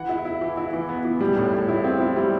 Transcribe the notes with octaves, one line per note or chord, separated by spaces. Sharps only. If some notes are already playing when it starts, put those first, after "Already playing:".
Already playing: E3 F#5
E4
E4
E3
E4
E3
B3
E3
G3
A2
A2
E4
C4
E4
G3